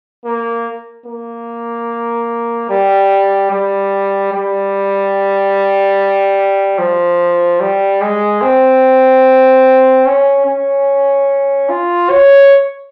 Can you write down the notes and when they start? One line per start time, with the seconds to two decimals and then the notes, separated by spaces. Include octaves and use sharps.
0.25 A#3
1.06 A#3
2.70 G3
3.51 G3
4.33 G3
6.78 F3
7.60 G3
8.01 G#3
8.42 C4
10.06 C#4
10.46 C#4
11.69 F4
12.10 C#5